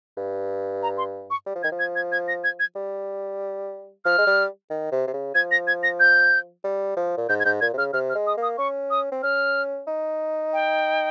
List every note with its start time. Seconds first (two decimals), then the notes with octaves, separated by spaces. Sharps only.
0.17 G2
0.83 A#5
0.98 C6
1.30 C#6
1.47 G3
1.55 F3
1.63 D#3 G#6
1.72 F3
1.79 G#6
1.96 G#6
2.12 G#6
2.28 A#6
2.44 G#6
2.60 G#6
2.76 G3
4.05 F3 F6
4.18 G#3
4.27 G3
4.70 D#3
4.92 C3
5.08 C3
5.14 C#3
5.35 F3 G#6
5.51 A#6
5.67 G#6
5.83 A#6
6.00 G6
6.64 G3
6.97 F3
7.18 A#2
7.29 G#2 G6
7.40 G#6
7.45 G#2 G6
7.61 A#2 G#6
7.74 C3
7.78 C#3 F6
7.93 C3 F6
8.10 F6
8.15 G#3
8.27 D#6
8.37 A#3
8.42 D#6
8.58 C#4 C#6
8.91 D#6
9.12 C4
9.23 C#4 F6
9.88 D#4
10.53 G5